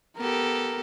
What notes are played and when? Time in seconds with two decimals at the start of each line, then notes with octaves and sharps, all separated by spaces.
0.18 B3 G4 A4 A#4